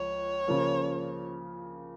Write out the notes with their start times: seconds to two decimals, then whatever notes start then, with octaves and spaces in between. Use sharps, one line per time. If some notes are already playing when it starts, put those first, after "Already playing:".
Already playing: C#2 F3 C#5
0.48 C#3 F3 A#3